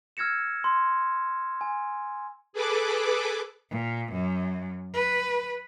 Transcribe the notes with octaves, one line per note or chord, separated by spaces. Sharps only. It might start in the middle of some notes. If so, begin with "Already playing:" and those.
E6 F6 G#6 A#6 C#7 E7
C6
G#5
G#4 A4 B4 D6
A#2
F#2
B4